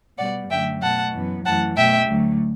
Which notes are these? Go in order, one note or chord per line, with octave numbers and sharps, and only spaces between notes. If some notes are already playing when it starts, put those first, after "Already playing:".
B2 G3 B3 D5 F#5
F#2 D3 F#3 A3 E5 G5
B2 A3 F#5 A5
F#2 E3 B3
F#2 E3 A3 F#5 A5
B2 A3 E5 G5
D2 D3 F#3 A3